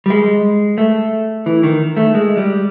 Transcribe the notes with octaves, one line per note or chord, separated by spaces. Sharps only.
G3
G#3
A3
E3
D#3
A3
G#3
G3